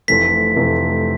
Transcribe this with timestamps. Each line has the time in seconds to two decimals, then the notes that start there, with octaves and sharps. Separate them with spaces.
0.08 F1 F2 C3 E3 A3 B6
0.56 F1 F2 C3 E3 A3